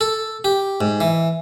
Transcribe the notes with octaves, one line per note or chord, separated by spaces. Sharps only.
A4
G4
G#2
E3